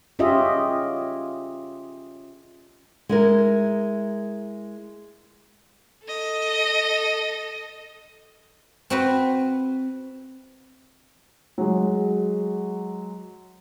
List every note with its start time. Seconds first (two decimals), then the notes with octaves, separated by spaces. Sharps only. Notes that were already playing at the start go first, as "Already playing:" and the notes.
0.19 C#4 F4 G4 G#4 D#5 E5
3.09 G#3 E4 A#4
6.04 A4 D#5
8.90 C4 F#4 B4
11.58 F#3 G#3